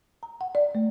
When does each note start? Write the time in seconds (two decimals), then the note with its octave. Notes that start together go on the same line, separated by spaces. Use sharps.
0.23 A#5
0.41 F#5
0.55 D5
0.75 A3